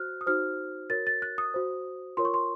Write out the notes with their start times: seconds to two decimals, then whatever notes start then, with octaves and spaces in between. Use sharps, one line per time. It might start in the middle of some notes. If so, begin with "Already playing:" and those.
Already playing: F#4 C5 F6 F#6
0.21 D#6
0.26 D#4 F#4 C5 F6
0.90 F#4 A#4 C#5 A6
1.07 A6
1.22 F#6
1.38 D#6
1.54 F#4 C5
2.17 F4 A#4 C#5 C6
2.25 C#6
2.34 C6